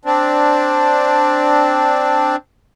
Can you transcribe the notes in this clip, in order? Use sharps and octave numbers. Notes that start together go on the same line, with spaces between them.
C4 D4